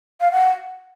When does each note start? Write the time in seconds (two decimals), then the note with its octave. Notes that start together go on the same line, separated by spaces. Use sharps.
0.21 F5
0.32 F#5